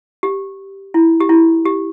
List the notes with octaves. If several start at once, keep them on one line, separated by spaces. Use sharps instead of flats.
G4
E4
G4
E4
G4